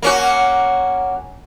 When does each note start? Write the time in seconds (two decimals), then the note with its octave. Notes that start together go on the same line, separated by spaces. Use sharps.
0.02 A#3 C#4 F#4